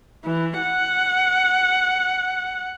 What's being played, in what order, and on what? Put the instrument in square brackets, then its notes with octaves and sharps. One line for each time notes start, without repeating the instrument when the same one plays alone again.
[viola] E3
F#5